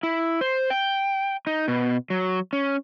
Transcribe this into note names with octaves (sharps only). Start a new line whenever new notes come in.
E4
C5
G5
D#4
B2
F#3
C#4